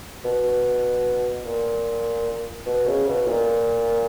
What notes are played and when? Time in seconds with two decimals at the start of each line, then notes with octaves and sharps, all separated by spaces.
0.25 B2
1.45 A#2
2.66 B2
2.87 C#3
3.07 B2
3.27 A#2